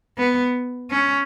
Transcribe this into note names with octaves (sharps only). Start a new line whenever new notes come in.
B3
C#4